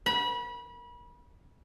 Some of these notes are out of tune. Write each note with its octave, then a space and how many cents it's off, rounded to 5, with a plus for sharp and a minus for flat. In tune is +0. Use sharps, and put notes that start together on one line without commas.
B5 -30